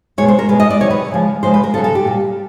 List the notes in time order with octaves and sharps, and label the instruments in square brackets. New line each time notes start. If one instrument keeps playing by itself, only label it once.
[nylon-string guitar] B2 G#3 C#5
C5
A#4
B2 G#3 B4
D#5
D5
C3 D#3 F#3 C#5
B4
C#3 F3 G#3
C#3 F3 G#3 C5
B4
A#4
C#3 F#3 A4
A4
G4
A#2 G3